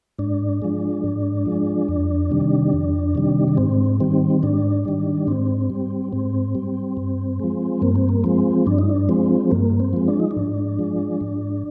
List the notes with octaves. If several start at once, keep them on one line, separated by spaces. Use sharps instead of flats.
G#2 D4
F3 G#3
G#2
F3 G#3
F2
C3 D#3 G3
F2
C3 D#3 G3
D4
G#2 C4
D#3 G3 C4
G#2 D4
D#3 G3
G#2 C4
G3
G#2 C4
G3
G2
F3 G#3
G2 A#3
C4
A#3
F3 G#3 C4
G2 D4
D#4
D4
F3 G#3 C4
G2 A#3
C4
F3 G#3
D4
D#4
D4
G#2
F3 G#3
G#2